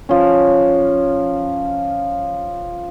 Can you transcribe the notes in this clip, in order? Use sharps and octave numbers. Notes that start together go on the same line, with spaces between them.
F3 C#4